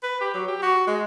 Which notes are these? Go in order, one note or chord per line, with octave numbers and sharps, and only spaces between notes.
B4
G4
F#3
G4
F#4
G#3